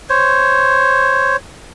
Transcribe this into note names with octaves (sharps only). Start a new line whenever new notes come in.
C5 C#5